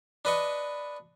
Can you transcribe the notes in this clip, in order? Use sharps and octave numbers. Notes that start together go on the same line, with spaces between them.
D4 B4 D#5 C#6